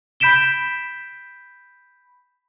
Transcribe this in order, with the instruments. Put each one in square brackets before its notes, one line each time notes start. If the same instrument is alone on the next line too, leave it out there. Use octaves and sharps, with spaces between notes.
[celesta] B5 G6 B6 D7 E7 G7